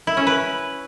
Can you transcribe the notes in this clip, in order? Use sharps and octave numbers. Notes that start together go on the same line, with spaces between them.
E4
C#4
B4